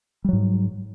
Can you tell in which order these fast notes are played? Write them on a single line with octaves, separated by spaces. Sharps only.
G3 F#3 G#2